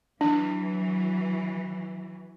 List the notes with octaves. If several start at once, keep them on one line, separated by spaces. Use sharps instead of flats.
E3 F#3 D4